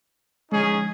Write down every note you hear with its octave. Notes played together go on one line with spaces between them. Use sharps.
D3 F3 G#3 C#4 D#4 G#4